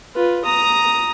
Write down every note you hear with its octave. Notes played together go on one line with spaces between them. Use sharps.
F4 B4
A#5 D#6